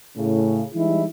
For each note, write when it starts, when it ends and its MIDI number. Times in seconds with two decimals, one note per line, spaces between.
0.18 0.62 45
0.18 0.62 49
0.75 1.05 52
0.75 1.05 55
0.75 1.05 56
0.75 1.05 63
0.75 1.05 64